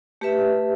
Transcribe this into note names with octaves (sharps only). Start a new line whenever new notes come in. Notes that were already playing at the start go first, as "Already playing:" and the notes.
A3 G4 B4 E5